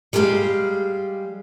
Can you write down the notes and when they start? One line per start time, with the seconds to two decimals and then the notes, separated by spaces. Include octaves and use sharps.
0.13 G3 G#3 G4 G#4 F5